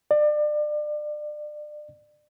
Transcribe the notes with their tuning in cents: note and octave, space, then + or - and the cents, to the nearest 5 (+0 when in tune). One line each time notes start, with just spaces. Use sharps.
D5 +30